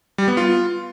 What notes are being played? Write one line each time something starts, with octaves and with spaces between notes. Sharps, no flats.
G3
B3
F4